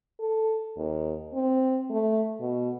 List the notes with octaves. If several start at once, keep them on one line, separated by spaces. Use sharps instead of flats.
A4
D#2
C4
A3
B2